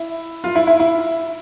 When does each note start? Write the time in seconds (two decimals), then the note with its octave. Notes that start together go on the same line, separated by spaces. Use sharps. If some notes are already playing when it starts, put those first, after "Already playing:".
Already playing: E4
0.44 F4
0.55 E4
0.67 E4
0.80 E4